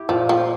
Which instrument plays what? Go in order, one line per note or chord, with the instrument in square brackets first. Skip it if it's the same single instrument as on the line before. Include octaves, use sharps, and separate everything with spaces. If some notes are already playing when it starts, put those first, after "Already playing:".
Already playing: [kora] E4 G4
[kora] A#2 [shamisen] F3
[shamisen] F3 [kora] G4